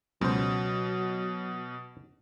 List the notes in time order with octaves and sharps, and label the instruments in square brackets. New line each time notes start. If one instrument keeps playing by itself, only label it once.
[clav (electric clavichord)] C#2 C5 [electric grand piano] B2 [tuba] F#3